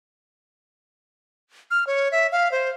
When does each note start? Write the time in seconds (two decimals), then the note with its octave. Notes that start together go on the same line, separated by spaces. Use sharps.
1.71 F6
1.87 C#5
2.12 E5
2.32 F5
2.52 C5